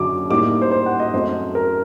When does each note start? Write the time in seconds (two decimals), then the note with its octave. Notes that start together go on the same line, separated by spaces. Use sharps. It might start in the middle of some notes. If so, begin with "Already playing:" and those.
Already playing: F#2 D3 F#3 D6
0.30 A2 G3 A#3 D#4 D6
0.61 C5
0.72 C5
0.86 F#5
1.00 D#5
1.14 F#2 F#3 A3 C4 C5
1.55 A#4